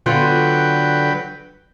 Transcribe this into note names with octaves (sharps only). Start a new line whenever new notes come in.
D3 F#3 B3 F4 B4 G5